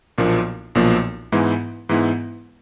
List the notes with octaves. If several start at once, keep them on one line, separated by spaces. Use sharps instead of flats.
B1 A#2 F3 A#3 D4
B1 A#2 F3 A#3 D4
G#2 E3 G#3 B3 E4
G#2 E3 G#3 B3 E4